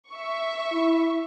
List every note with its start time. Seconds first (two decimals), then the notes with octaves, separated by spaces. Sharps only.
0.11 E5 C#6
0.72 E4